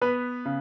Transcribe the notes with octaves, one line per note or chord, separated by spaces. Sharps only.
B3 B4
C#3